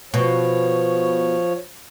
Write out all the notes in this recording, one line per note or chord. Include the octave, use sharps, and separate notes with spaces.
B2 F3 C#5